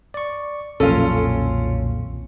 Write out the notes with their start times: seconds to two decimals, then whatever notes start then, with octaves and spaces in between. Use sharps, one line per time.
0.14 D5 C#6
0.80 B1 F2 A#2 D#3 F#3 C#4 F4 A4